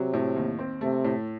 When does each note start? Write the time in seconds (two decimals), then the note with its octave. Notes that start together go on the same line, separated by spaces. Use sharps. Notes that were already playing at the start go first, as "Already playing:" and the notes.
Already playing: C3 F#3
0.14 A2
0.36 D#2
0.59 C4
0.81 C3 A3
1.05 A2